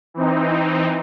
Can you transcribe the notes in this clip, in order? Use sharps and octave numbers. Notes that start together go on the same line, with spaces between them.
E3 C4 D#4